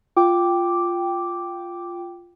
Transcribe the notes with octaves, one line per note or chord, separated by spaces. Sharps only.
F4 G5 D6